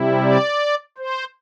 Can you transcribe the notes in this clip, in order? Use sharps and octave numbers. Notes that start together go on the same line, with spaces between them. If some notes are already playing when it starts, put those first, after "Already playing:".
Already playing: C3 G3 E4
D5
C5